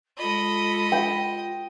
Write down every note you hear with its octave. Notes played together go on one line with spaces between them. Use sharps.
G#3 F4 A4 D#5 B5
G5